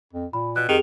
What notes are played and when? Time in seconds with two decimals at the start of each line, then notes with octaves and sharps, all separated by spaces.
0.13 F2
0.33 A#2 B5
0.56 B2 F#6
0.69 F2 D#3 G4 G#4 F7